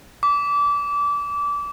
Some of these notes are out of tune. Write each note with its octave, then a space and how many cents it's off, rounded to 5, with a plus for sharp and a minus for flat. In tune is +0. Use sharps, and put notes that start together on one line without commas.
D6 -25